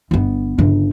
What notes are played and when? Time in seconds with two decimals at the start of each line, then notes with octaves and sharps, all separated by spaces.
0.11 G1 B3
0.58 G1 C#3